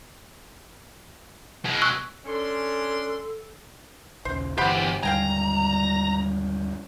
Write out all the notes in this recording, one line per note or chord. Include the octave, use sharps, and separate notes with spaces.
B2 G#3
C#6 E6 F#6
C#4 D4 A4 C6
A#1 D#2 C#3 C5
G1 D3 E3 G4 C5 F#5 B5
D#2 G#2 D3 G3 F5 G5 G#5 A#5